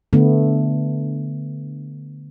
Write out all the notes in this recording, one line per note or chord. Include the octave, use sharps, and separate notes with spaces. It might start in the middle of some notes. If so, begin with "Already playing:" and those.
D3 A3 B3